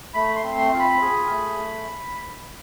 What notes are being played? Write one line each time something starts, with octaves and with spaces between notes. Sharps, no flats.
A3 B5
C6
C4
C6
F4
B5
G#4
A3